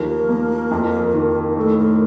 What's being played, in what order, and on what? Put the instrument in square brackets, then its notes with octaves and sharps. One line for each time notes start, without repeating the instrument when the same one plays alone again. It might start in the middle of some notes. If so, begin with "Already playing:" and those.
Already playing: [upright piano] D#2 F3 [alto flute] A#4
[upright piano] A#3
F2
D#3
[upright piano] A2 [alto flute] A4
[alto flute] A#4